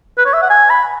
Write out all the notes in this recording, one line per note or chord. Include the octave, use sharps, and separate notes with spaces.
B4
C#5
E5
F#5
G#5
B5